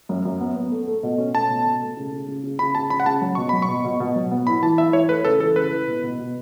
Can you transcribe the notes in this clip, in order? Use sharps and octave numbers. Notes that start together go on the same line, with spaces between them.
F#2
F#2
B3
B3
A3
A3
B2
C#4
A3 A5
B2
B2
A3
C#3
C#3
C#3
C#3
C#3 B5
C#3 A5
C#3 B5
F#5
C#3 A5
F#3
B2 C#6
F#3 B5
C#6
B2
B2
B2
F#3
B3
E4 B5
E3 A5
E4 E5
E3 C#5
A3 B4
C#3 A4
E3 A4
C#3 B4
E4
B2
B2
B2